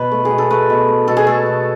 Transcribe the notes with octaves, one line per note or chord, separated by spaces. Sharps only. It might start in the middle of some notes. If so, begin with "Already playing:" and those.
Already playing: B2 B4
A3
G#4
B2
A4
A3 B4
B2
A3
B2 A4
G#4
A3 A4
B2